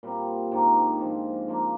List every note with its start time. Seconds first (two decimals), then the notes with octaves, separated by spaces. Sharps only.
0.03 A#2 G3 C4
0.51 G#2 D#3 A#3 D4
0.99 G#2 F3 C4
1.48 F3 A#3 D4